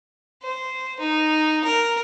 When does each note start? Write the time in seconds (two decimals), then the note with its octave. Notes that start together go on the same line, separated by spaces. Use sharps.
0.43 C5
0.99 D#4
1.64 A#4